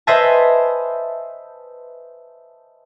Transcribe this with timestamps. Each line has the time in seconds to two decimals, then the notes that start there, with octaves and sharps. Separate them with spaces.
0.07 B4 C5 D#5 E5 G#5 A5